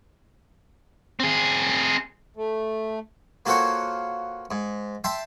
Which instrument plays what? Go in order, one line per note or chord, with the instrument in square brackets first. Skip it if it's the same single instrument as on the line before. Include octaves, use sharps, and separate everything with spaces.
[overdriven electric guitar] C4 G#4
[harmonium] A3
[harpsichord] A#3 F4 F#4 A4 C5 C#5
G#2
E5 G5 A5 C6